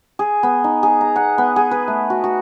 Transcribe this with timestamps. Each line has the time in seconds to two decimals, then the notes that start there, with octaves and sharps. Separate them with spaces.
0.19 G#4
0.43 B3
0.64 D#4
0.83 G#4
1.01 A#5
1.16 F#5
1.38 B3
1.56 G#4
1.71 B4
1.88 A3
2.10 F#4
2.24 F#4